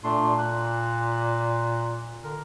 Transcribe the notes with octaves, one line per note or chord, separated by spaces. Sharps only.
A#2 A3 D4 C6
F#6
D3 A#4